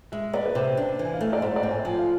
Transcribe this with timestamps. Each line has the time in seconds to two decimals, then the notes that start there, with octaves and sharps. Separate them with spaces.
0.12 G#3 E5
0.33 B3 D5
0.46 B4
0.55 C3 C5
0.77 D4
0.99 E3
1.05 G#5
1.14 F5
1.21 A3 E5
1.33 D5
1.42 G#2 C5
1.56 D5
1.63 C4
1.71 G#5
1.85 F3 G#5
1.99 F5